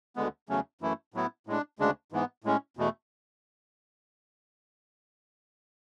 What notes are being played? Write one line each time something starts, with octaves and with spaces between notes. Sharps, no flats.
D2 D3 G#3 B3
E2 C#3 F#3 A3 C#4
F#2 E3 A3 E4
A2 F#3 B3 E4
A2 G#3 D4
D2 C#3 G#3 D4
G#2 E3 B3
A2 G#3 C#4
E2 B2 A3